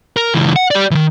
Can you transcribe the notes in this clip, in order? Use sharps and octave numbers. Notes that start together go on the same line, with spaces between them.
A#4
C#2 E3
F#5
G4 D5
D#3 E3